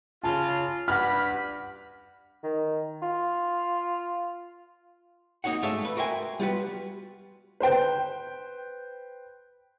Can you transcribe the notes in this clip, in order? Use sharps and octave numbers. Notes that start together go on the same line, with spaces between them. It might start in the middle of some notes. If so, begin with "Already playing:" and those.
C#3 F4 A5
G2 B4 F#5 B5 F6
D#3
F4
A#3 D#4 F#4 C#5 F#5
G#2 A3 C#5 E5 F5
A3 B4
F#4 A#4 C5 E5 G5 G#5
G3 F4 F#4 B4
B4 C5 G5